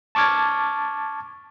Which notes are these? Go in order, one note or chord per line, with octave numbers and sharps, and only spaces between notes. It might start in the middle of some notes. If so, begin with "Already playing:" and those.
A5 C#6 D6 F6 G#6 A6